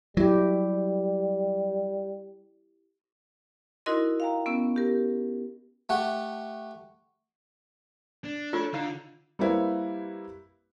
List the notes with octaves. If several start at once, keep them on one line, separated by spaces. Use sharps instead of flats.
F#3 G3 E4 G4
D#4 E4 F#4 A#4 D#5 C6
F5 G5 A#5
B3 C#4 E6
G4 A#4
A3 G4 F#5
D4
A3 F4 A4 C#5
D3 D#4 F5
G3 A#3 C4 E4 B4 C#5